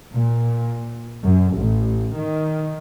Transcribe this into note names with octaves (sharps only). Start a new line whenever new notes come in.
A#2
F#2
A1
D#3